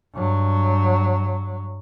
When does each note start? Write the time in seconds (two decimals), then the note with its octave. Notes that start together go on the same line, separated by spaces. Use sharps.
0.14 G2 F#3